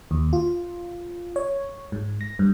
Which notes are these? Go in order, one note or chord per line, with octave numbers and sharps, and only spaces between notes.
D#2
F4
C#5
G#2
A#6
G2